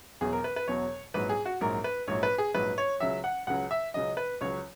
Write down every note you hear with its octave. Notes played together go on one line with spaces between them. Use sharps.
E1 E2 B2 F#3 G#4
A#4
B4
B4
E1 E2 B2 F#3 C#5
A#1 G#2 F#3 B4
G#4
F#4
A#1 G#2 F#3 A#4
B4
A#1 G#2 F#3 C#5
B4
G#4
A#1 G#2 F#3 B4
C#5
C#2 C#3 F#3 E5
F#5
C#2 C#3 F#3 F#5
E5
C#2 C#3 F#3 D#5
B4
C#2 C#3 F#3 C#5